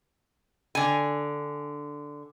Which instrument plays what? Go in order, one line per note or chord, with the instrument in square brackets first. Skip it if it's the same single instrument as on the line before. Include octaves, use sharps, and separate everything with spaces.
[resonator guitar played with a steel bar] D3 G#5